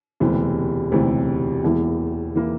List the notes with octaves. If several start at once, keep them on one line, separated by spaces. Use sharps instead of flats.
E1 D2 C3 E3
E1 D2 C3 E3
E1 E2 E3 A#3 E4
E3 A#3 E4